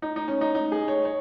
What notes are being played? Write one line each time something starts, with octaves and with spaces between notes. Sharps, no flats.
D#4
D#4
C#4
D#4
D#4
G#4
C#5
C#5